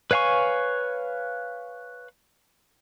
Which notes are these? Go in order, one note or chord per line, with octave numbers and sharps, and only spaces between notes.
B4 C#5 F5 G#5 C#6